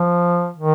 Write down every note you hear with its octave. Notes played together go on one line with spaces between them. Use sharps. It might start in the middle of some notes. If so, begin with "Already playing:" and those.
Already playing: F3
D#3